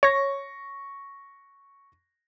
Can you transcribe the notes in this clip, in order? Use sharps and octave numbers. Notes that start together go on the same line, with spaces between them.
C#5 C#6 A#6